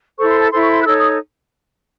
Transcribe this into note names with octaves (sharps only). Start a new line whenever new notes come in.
E4 A4 C5 C#6
C6
A5
E4 A4 C5 C6
C#6
C6
F#6
D#4 A4 C#5 E6
D#6